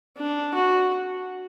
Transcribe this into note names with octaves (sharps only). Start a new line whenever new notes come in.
D4
F#4